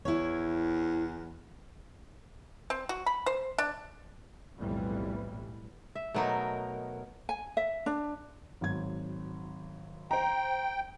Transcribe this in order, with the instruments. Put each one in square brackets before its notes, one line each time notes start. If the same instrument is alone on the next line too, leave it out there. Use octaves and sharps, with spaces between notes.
[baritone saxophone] E2 [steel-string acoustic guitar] E4 C#5
[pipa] C4
F#4
B5
C5
D4
[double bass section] B1 F2 A2 E3 G3
[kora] E5
[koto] B2 F#3 A#4 [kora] A3 B3 D#4
[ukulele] G#5
E5
D4
[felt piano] G#1 F#3 G#6
[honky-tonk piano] C5 A#5 [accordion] G5